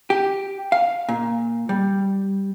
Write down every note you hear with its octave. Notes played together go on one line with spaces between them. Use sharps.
G4
F5
A#2
G3